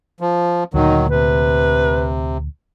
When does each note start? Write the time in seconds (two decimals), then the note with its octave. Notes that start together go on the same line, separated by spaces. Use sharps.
0.20 F3
0.74 D2 A#2 D#3 F#3 D#4
1.10 C3 B4